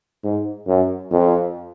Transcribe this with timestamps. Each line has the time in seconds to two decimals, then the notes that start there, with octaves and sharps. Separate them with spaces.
0.24 G#2
0.67 F#2
1.11 F2